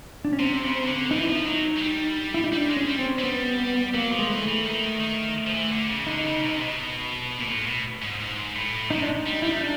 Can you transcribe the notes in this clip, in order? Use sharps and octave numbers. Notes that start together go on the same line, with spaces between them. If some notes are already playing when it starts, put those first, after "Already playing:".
D4
C#4
C3 C4
C#3
D3
E3 D#4
E4
F3 D#4
F#3
G#3
G3
E4
D#4
G3 D4
G#3
C#4
G3
C4
G#3
G3 B3
F#3 A#3
F3
G#3
E3 A3
E3
D#3
D#3
F3
E3
D3
C#3
D3 D#4
C#3
C3
B2
A#2
A2
B2
G#2
G#2
A2
C3 D#4
D4
D#4
G3
G3 E4
D#4
D4